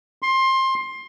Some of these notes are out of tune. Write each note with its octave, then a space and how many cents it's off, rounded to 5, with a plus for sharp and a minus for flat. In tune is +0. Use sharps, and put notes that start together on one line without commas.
C6 +20